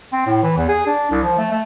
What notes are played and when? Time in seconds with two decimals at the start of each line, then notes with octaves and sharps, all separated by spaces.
0.12 C4
0.26 A2
0.43 E3
0.57 E2
0.68 G#4
0.86 D4
1.10 C2
1.23 F3
1.38 A3
1.51 A3